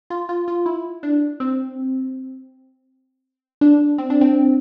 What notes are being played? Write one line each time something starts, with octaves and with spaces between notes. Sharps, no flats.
F4
F4
F4
E4
D4
C4
D4
C4
D4
C4